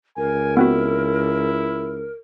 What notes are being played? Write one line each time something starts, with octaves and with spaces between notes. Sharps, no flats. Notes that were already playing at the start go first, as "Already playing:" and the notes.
C#2 A#4 G#5
B3 C4 E4 F#4